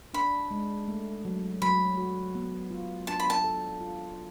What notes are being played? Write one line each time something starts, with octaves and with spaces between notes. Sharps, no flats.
D4 B5
G#3
A3
F#3
F#3 B5
F#4
B3
F4
D4 A5
B5
A5
A4
F4